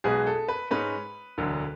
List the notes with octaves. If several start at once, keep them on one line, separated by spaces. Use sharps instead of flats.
B1 B2 G#3 B3 G#4
A4
B4
G#2 G#3 C#4 B4
E1 D2 D3 F#3